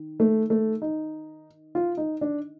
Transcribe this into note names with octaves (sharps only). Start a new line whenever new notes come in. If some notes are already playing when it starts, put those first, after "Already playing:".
Already playing: D#3
A3
A3
D#4
F4
D#4
D4